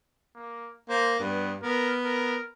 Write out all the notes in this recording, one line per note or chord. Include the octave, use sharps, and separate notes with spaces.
A#3
A#3 C5
G2 B3
B3 A#4
A#4